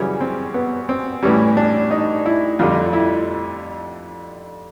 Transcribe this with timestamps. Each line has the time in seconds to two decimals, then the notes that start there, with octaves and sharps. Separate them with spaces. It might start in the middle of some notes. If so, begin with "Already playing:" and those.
Already playing: F#2 C#3 E3 G3 C#4
0.21 C4
0.54 B3
0.89 C4
1.23 A2 E3 G3 C#4
1.57 D4
1.91 D#4
2.26 E4
2.59 F2 D3 G3 F4
2.93 E4